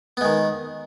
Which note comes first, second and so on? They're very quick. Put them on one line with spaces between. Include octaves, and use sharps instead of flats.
B3 G#3 D#3